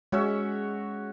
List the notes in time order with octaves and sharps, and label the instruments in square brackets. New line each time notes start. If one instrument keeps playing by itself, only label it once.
[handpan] G#3 [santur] C#4 F#4 C#5 E5